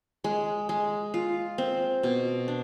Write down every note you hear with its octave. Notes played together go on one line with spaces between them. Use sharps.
G#3
G#3
F4
C4
B2
D4